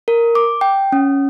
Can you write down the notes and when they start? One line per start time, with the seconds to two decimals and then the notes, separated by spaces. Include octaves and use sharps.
0.08 A#4
0.35 D6
0.61 G5
0.92 C#4